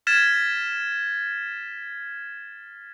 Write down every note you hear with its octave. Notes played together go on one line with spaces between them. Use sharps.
F6 G#6 A6 B6 E7